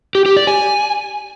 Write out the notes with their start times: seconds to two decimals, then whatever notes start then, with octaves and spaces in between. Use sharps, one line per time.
0.15 G4
0.26 G4
0.37 D5
0.47 G#5